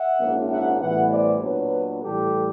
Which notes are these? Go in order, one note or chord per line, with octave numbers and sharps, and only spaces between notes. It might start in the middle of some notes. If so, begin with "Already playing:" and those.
Already playing: E5 F#5
A#1 G#2 F3 A#3 C#4
E5 F#5
A1 A2 E3 G3 B3 E5 F#5
C5 D5
A#2 F#3 B3 D4 B4 C#5
A2 E3 G3 G4 A4